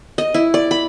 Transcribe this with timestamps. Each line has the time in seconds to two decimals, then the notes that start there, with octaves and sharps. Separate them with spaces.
0.18 D#5
0.34 E4
0.54 D5
0.71 B5